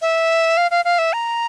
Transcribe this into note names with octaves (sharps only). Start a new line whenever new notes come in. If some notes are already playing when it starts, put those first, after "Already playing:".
E5
F5
F5
F5
E5
A#5